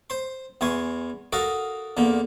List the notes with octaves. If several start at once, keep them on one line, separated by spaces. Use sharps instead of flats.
C5 C6
E2 E3 G#5 C6 C#6
F#4 A4 A#4 D#5 F5 F#5
E2 D3 A#3